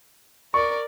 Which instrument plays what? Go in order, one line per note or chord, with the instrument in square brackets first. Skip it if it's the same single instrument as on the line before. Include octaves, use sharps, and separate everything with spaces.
[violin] A#4 D5 [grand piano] C#6